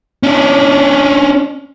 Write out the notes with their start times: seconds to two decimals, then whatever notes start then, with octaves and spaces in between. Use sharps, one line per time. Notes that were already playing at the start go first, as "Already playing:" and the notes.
0.23 C#4 D4